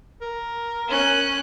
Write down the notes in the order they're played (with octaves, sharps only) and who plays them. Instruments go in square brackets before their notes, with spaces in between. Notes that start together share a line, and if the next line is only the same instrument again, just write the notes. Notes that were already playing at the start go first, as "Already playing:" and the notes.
[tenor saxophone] A#4
[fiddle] C#4 F#6